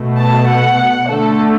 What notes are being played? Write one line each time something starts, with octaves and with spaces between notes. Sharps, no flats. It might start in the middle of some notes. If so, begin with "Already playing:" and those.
Already playing: B2 A3
A5
F#5
D3 A3 A4